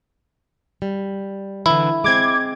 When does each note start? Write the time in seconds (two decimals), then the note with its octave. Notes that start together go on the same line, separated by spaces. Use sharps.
0.82 G3
1.66 D3 E3 E4
2.04 G#3 C4 D6 G#6